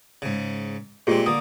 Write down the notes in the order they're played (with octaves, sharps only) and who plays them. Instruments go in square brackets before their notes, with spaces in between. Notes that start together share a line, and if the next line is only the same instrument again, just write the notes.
[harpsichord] G#2 C#3
[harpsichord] A#2 G#3 C4 [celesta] F4 G4 G#4
[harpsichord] D3 A#3 [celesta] D#6